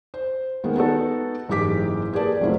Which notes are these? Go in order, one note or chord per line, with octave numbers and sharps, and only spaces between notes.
C5
D#3 G#3 A#3 B3
B3 D#4 F#4 A4
F#1 G#2 E3 G4 D6 B6
A#3 G4 G#4 B4 D5 A5
F#1 F#3 A3 C4 E4 F4